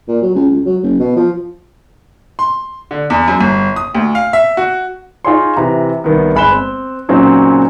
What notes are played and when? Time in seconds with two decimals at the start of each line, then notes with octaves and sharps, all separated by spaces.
0.08 A#2
0.22 F#3
0.35 C#2
0.50 C#2
0.65 F#3
0.83 F#1
0.99 B2
1.16 F3
2.39 C6
2.91 D3
3.10 E2
3.28 F#2
3.41 G1
3.76 D#6
3.95 D2
4.15 F5
4.33 E5
4.57 F#4
5.25 D#4 F4 G#4 C#5 C6
5.57 C3 E3 A#5
6.04 C2 D#3 B3
6.35 G1 G#3 B5 F#6 E7 G7
6.51 C4
7.09 A#2 C#3 F#3 C4 C#4 D#4